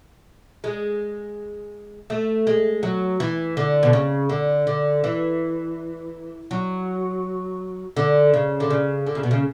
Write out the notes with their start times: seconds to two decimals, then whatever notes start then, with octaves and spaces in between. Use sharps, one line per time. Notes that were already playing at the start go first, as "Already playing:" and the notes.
0.64 G#3
2.10 A3
2.47 G#3
2.83 F#3
3.20 E3
3.57 D3
3.83 B2
3.93 C#3
4.29 D3
4.67 D3
5.04 E3
6.51 F#3
7.97 D3
8.34 C#3
8.60 D3
8.70 C#3
9.07 D3
9.15 C#3
9.23 B2
9.31 C#3